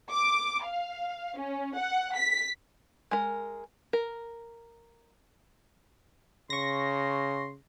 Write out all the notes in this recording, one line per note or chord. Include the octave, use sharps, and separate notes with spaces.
D6
F5
C#4
F#5
B6
G#3 A#4
A#4
C#3 C6 C#6 A#6